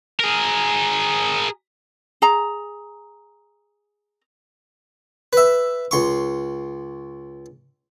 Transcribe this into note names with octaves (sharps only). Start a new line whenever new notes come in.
G#4 A#4
G#4 A#5
B4 E5
C#2 C6 C#6